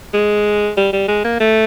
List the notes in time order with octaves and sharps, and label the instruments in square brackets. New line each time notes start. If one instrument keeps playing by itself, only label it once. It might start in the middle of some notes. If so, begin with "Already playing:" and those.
[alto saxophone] G#3
G3
G3
G#3
A#3
A3